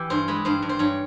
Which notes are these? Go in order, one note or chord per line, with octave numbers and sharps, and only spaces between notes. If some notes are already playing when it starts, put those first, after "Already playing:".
Already playing: E3 G4
G2 C5
G#3 B4
G2 C5
G2
C5
G2 C#5